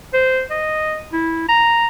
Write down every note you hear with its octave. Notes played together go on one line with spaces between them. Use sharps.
C5
D#5
E4
A#5